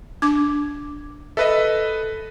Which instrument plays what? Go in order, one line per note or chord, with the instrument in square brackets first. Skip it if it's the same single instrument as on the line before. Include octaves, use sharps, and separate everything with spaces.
[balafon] D4 D6
[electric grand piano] A4 B4 D#5 [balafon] E5